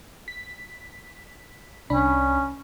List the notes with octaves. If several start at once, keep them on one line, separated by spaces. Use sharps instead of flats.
B6
C2 C#4 D4 B5